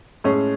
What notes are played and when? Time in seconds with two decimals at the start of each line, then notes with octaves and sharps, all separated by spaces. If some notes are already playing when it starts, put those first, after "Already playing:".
0.24 A2 G#3 C#4 G#4